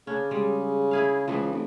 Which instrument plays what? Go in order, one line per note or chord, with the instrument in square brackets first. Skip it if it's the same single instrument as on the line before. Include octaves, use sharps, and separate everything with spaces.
[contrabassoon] C#3 [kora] C#4 D4
[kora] G3 G#3
E4 G#4 F5
[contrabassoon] C#2 [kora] E3 F3
[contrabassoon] F1